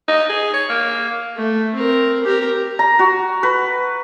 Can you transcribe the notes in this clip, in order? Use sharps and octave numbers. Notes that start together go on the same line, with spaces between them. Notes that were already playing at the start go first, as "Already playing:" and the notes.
D#4
G#4
C#5
A#3
A3
C4 A#4
G4 A#4
A#5
F#4
B4